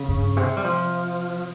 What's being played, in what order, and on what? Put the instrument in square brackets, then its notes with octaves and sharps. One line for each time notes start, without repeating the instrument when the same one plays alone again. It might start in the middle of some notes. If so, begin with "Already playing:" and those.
Already playing: [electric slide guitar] C#3
[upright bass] G2
C3
[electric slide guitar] G3
F3